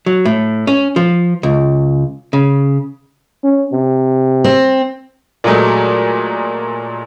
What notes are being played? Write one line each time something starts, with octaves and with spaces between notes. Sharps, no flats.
F#3
A2
C#4
F3
C#2
C#3
C#4
C3
C4
A#2 F#3 G#3 A3